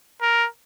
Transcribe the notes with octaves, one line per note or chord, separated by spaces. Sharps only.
A#4